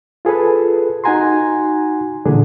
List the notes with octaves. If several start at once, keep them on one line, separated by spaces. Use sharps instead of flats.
F4 G#4 A4 B4
D#4 F#4 F#5 G#5 A#5 C6
A#2 D3 E3 D4 G#4